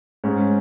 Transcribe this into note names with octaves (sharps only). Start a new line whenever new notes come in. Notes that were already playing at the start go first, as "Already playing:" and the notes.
G#2 C#4